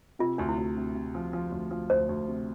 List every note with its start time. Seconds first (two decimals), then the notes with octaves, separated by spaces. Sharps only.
0.19 C3 F4
0.38 D2 D4
0.49 E4
0.58 D2
0.77 C3
0.95 C3
1.15 F3
1.33 F3
1.52 D2
1.71 F3
1.90 D2 C5
2.09 D2
2.28 C3